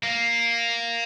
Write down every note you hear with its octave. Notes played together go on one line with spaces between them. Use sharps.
A#3